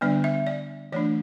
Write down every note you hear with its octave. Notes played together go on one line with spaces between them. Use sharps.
D3 G3 B3 D4 D5
E5
D5
E3 A3 D4 D5